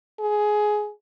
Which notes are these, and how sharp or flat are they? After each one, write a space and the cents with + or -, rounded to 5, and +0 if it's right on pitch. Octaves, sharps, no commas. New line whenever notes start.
G#4 +15